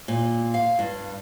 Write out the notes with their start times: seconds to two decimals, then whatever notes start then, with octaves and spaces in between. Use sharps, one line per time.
0.08 A#2
0.54 F5
0.79 G2